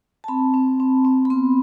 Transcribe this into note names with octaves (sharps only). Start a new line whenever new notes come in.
A5
C4 B5
C4
C4
C4
B5
B3 C6